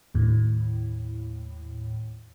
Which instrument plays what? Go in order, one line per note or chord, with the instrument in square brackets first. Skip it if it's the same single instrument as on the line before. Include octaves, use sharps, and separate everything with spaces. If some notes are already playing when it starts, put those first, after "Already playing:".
[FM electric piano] D#2 A2